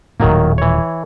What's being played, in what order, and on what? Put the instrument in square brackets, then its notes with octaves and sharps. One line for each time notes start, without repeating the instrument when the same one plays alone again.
[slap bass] D#1 A2 [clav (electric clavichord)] D#3 F#3 A#3
[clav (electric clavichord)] E3 C#5